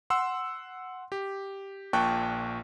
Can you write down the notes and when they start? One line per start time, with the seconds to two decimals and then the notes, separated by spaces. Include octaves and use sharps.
0.10 F#5 C6 E6
1.12 G4
1.93 A#1 A#2 G5 A5 C#6 F#6